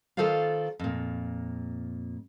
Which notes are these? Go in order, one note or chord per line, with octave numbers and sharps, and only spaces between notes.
D#3 F4 A4 C5 D5 F5
F2 A#2